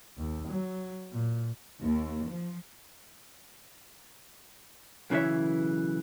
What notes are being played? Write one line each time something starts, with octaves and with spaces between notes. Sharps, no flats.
D#2
F#3
A#2
D#2
F3
B1 C#3 E3 C#5 E5